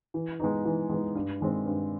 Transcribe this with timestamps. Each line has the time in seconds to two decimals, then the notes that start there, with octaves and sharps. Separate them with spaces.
0.14 E3
0.40 G#3 B3 D#4
0.65 E3
0.89 G#3 B3 D#4
1.15 G2
1.40 D#3 G#3 C4
1.66 G2